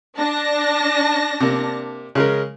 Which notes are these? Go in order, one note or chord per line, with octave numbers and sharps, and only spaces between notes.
D4 A5 A#6
C3 A#3
C#3 G#3 A#4